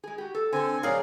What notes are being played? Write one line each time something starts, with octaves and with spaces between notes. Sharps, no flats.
G#3 G#4
F#4 G4
A4
D3 C4 A4 G#5
F#3 C4 D#4 G#4 A#4 D5 F5